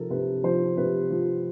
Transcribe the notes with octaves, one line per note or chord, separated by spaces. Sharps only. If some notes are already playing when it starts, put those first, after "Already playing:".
Already playing: C3 F3 A4 A#4
C3 B4
F3 C5
C3 B4
F3